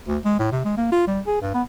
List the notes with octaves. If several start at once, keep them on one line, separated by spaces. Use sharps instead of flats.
D2
G#3
A2
C3
G#3
A#3
F4
G3
G#4
G2
B3